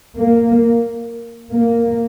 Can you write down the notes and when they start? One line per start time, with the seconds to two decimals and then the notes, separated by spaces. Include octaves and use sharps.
0.18 A#3
1.52 A#3